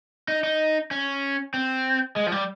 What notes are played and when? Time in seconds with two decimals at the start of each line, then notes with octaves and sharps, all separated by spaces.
0.28 D#4
0.44 D#4
0.91 C#4
1.54 C4
2.16 G#3
2.27 F3
2.32 G3